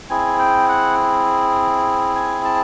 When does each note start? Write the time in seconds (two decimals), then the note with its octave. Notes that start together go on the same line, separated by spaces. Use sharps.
0.10 C4 E4 G#4 G#5
0.39 G5
0.68 F#5
2.15 G#5
2.44 A5